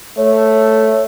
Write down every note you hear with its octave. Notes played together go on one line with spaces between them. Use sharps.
A3 C#5